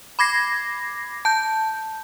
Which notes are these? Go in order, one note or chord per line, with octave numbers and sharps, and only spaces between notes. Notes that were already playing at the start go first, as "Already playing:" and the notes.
B5 D6 G#6 A#6 C7
A5 G6